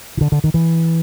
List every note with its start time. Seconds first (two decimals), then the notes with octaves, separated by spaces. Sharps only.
0.17 D#3
0.21 D3
0.32 D3
0.44 D#3
0.54 E3